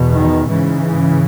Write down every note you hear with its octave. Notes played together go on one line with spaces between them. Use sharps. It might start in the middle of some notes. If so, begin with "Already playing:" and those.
Already playing: E2 B2
D#3
G#2 C#3 E3